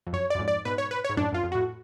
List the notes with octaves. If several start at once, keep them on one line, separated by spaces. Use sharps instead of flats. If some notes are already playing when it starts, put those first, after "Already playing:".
F2
F#2 C#5
F#2 D5
F2 G#2
D5
G#2 B2 B4
C#5
B4
C#5
G#2
F#2 A2 D4
F#2 F4
F2
A2 F#4